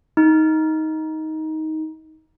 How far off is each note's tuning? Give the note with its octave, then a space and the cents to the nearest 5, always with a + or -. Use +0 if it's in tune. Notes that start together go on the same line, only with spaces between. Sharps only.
D#4 +15